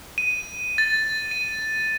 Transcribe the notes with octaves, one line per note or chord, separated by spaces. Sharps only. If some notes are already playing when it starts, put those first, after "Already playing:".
D#7
A6
D#7